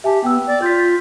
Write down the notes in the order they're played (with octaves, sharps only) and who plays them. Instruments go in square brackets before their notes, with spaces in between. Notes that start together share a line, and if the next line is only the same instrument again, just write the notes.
[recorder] G4 [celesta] E5 G#5 A5
[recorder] B3 [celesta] G5 E6
[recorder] D5
[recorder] F4 [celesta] G6 B6